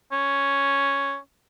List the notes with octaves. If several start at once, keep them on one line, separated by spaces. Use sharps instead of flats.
C#4